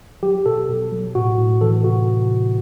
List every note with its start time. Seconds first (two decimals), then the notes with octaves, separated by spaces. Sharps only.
0.23 F#3 G4
0.46 B2 A4
0.69 B2
0.92 F#3
1.15 A2 F#4
1.38 A2
1.61 E3 A4
1.84 C3 F#4